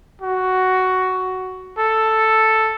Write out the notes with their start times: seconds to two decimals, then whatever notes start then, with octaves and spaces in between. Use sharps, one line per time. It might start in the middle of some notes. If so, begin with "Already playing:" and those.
0.22 F#4
1.78 A4